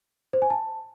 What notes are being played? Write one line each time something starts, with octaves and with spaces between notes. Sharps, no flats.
C5
G#5
A5